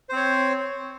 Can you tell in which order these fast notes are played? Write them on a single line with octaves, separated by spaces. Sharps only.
C5 C4 C#5